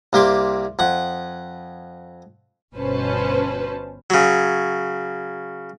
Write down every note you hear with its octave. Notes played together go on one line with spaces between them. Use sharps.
C2 A#3 G4 C6 D6
F2 F#5
G1 B2 C#4 B4 C5 A5
C#3 F#3